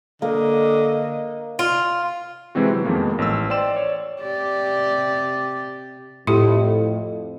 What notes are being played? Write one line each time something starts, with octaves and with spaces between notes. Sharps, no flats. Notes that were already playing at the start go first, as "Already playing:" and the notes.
D3 A#3 D#5
F4
C3 E3 G#3 C4 F#4
E3 F#3
F2 D#3 F3 G#3 A#3 B3
A1 E6
C5 D5 G5 C6 E7
C#5 D5
C3 G4 D5
F2 A2 E4 G4